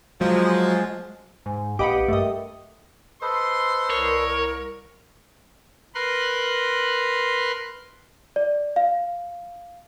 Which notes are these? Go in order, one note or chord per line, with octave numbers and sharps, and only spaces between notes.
F3 F#3 G#3
G#2 G#5
A#1 G4 B4 D#5 F5 F#5 D6 C#7
G2 A3 A#4 D#5 E5
A4 B4 C5 D#5 C6
C2 A#4 C#5
A#4 B4 C6 F#6
D5
F5